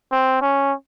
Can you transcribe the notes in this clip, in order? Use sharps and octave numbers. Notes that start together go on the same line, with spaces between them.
C4
C#4